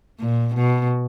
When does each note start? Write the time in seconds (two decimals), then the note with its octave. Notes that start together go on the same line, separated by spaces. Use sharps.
0.20 A#2
0.54 B2